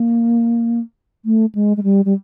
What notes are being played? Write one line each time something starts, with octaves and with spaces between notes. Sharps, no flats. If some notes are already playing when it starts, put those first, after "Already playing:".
Already playing: A#3
A3
G#3
G#3
G3
G3